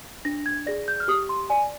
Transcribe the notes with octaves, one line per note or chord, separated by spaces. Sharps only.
D4 A#6
G#6
G#4 D5 A#6
G6
F6
G4 D#6
C6
D5 G#5